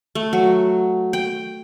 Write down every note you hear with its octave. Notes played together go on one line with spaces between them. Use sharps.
A3
F#3
G5